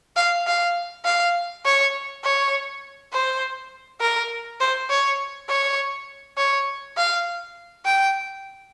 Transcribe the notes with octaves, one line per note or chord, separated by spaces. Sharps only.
F5
F5
F5
C#5
C#5
C5
A#4
C5
C#5
C#5
C#5
F5
G5